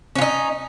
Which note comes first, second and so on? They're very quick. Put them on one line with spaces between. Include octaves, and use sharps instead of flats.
C#4 F4 D#4